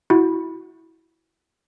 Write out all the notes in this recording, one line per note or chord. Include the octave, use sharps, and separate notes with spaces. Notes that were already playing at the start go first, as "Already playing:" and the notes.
E4 F#4